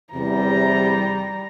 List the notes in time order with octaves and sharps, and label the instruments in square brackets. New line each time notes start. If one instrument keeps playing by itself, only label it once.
[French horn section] E2 C3 [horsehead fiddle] G3 A#5